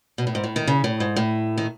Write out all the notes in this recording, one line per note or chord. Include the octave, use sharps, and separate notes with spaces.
B2
A2
G#2
A2
D#3
C#3
A2
G#2
A2
D#3